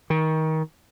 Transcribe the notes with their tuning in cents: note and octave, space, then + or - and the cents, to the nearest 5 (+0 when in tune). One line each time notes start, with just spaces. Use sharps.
D#3 +25